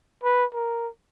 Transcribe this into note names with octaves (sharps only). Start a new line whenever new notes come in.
B4
A#4